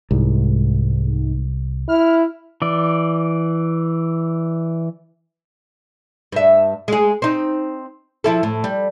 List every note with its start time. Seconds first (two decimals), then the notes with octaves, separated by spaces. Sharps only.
0.11 C2 G#2
1.89 E4 F6
2.62 E3 D5
6.32 G2 E5
6.88 G#3 G#4
7.22 C4 D#4
8.24 F3 E4 A4
8.43 A2
8.64 G3